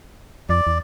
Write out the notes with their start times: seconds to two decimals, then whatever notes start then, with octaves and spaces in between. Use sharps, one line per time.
0.49 F2 D5
0.67 E2